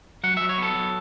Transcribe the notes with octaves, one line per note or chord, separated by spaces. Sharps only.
F#3 F#5
F#3 E5
C#5
B3 A4
F#3